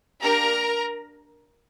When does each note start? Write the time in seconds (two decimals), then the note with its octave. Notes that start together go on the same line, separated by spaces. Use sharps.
0.23 A#3 D4 G4 A#4 A#5